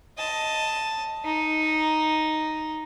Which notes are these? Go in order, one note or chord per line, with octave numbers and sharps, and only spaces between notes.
D#5 A5
D#4